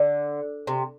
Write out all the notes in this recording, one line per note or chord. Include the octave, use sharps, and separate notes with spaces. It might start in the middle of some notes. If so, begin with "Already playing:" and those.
Already playing: D3
C3